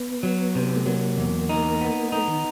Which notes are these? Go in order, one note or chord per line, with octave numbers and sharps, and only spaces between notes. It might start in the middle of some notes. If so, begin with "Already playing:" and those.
Already playing: B3
F#3
C3
A3
F#3 A#3
E2
D#4
B3
A3 D#4
D#3